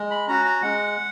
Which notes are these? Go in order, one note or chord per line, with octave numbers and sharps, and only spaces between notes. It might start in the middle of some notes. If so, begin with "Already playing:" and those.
Already playing: G#3
B5
C#4 F#4 A#5
A#5
G#3 F#5